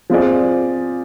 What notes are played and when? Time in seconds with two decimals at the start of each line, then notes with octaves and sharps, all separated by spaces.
0.10 F3 C4 F4 G#4 D5